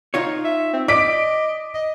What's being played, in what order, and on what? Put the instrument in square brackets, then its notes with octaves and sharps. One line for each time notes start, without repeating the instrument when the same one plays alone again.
[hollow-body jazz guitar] D#4 F4 C#5
[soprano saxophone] E5
C4
[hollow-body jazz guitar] D5 [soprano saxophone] D#5 [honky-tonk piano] D6 B6 D7
[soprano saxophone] D#5